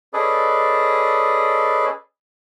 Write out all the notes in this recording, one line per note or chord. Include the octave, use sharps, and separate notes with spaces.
C#4 G#4 A4 B4 D5 D#5